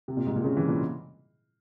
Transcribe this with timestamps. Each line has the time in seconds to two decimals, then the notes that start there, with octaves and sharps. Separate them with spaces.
0.08 C3
0.17 A#2
0.26 G#2
0.36 A#2
0.44 C#3
0.57 E3
0.68 A#2